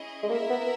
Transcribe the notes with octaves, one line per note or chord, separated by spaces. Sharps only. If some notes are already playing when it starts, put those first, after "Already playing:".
Already playing: C#4 E4 G#4 D#5
G#3
A#3 E4 A#4 E5
B3